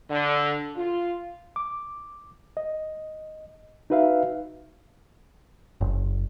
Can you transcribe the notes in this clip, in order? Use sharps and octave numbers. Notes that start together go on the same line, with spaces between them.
D3
F4
D6
D#5
D#4 F#4 B4 E5 F5
F#1